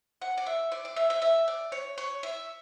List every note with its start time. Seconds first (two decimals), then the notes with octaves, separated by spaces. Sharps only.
0.22 F#5
0.37 D5
0.46 E5
0.72 D5
0.85 D5
0.96 E5
1.10 E5
1.22 E5
1.48 D5
1.72 C#5
1.98 C#5
2.23 E5